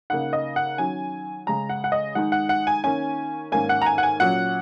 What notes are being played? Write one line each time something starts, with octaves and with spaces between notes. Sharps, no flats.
C#3 A#3 D#4 F#5
D#5
F#5
D#3 F#3 C#4 G#5
C#3 G#3 C#4 A#5
F#5
F#5
D#5
D#3 G#3 D#4 F#5
F#5
F#5
G#5
D#3 A#3 C#4 G#5
G#2 D#3 A#3 C#4 G#5
F#5
A#5
G#5
F#5
G#5
A#2 F#3 C#4 F#5